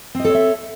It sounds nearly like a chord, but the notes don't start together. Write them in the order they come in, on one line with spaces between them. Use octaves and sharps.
C4 D#5 A4 C#5 E5